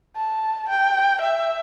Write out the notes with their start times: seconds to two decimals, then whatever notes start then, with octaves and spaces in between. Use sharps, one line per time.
0.16 A5
0.69 G5
1.21 E5